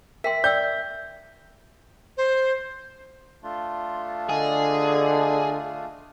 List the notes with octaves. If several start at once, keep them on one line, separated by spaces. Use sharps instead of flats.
A#4 E5 G5 C6 B6
D5 G5 E6 G6
C5
A3 D4 F4 C6
D3 G#4 D#5